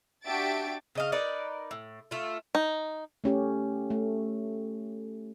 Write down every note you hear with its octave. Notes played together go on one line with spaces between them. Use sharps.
D4 F#4 G4 E5 A6 D7
C#3 D#5 F5
D#4 A#4 B4 D5
A2
A3 F4
D#4
A3 C#4 G4
A3